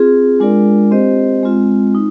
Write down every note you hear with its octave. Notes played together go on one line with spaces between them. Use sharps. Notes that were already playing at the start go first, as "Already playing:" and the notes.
Already playing: C4 F4 G#4
G#3 D4 F4 A#4 D5
C4 G4 C5 D#5
G#3 C4 F4
D#4